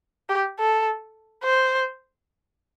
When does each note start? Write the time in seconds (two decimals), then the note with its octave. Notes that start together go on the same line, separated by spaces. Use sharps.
0.29 G4
0.59 A4
1.44 C5